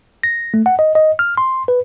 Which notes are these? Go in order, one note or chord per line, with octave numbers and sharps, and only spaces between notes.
A#6
A3
F#5
D#5
D#5
F6
C6
B4